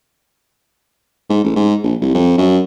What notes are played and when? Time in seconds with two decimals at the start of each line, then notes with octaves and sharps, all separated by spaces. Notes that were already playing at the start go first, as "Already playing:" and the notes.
1.29 G#2
1.44 A1
1.56 G#2
1.83 A#1
2.01 C2
2.14 F2
2.38 F#2